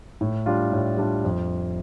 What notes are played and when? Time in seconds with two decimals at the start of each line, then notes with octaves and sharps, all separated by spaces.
0.21 A2
0.46 G3 D4 F4
0.72 A2
0.98 G3 D4 F4
1.25 F2